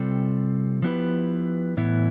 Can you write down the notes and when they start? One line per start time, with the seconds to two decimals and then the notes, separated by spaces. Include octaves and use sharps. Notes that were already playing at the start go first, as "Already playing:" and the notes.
Already playing: C3 G3 C4 F4 A4
0.82 F3 B3 E4 G4 B4
1.77 A2 E3 B3 E4